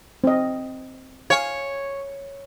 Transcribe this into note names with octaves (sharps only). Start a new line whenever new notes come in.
C4 D#5
C#5 F5 G#5